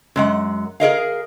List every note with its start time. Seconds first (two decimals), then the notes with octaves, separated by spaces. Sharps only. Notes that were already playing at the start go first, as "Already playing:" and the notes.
0.16 F#2 G#3 F#5
0.80 G#4 A#4 D#5 F5